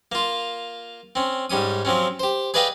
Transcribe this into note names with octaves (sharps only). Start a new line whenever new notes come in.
A#3 F4
C4 C#4
G#2 G3 C#4 D#6
F3 F#3 C4 C#4
G4 C5
G#4 B4 D5 D#5 F5 G5